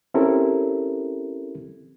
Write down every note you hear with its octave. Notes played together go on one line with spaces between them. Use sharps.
C4 C#4 E4 G4 A4 A#4